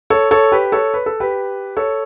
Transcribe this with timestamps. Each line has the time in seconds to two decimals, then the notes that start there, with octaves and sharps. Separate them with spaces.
0.10 A4 C#5
0.31 A4 C#5
0.52 G4 B4
0.72 A4 C#5
0.94 B4
1.06 A4
1.20 G4 B4
1.77 A4 C#5